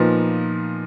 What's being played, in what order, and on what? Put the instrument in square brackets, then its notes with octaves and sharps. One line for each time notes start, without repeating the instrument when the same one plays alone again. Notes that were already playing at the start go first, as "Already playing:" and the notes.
Already playing: [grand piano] A#2 F3 B3 D#4